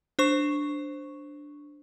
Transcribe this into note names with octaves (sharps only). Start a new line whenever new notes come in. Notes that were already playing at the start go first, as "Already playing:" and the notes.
D4 C5 C#6